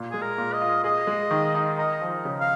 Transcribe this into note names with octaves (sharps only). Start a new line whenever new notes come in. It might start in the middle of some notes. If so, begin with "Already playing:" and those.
Already playing: A#2
G#3 G#4
A#4
A#2
D#5
F4
G#4 D#5
G#3
D#3
D#4
A#4 D#5
F3
C#3
F5